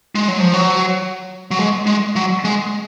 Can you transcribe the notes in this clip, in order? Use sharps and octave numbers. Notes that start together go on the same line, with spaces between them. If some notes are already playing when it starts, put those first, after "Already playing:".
G#3
F#3
F3
F#3
F#3
G#3
G#3
F#3
G#3